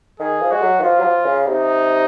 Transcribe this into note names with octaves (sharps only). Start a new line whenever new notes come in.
D#3 G#4
F3
G#3 F#4
F#3
D#3
F3 F4
F#3
F3
C#3
C3 D#4